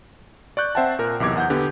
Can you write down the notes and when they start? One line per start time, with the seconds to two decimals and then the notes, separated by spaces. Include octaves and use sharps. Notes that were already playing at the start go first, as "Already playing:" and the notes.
0.57 D5 C#6 F#6 G6
0.75 C4 C5 E5 F#5 G5 A5
0.99 A#2 A#4
1.20 B1 E2 C3 D6 G#6
1.36 E2 F#5 G6
1.50 D3 B3 G4